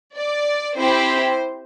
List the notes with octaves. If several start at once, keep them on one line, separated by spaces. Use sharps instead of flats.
D5
C4 E4 G4 C5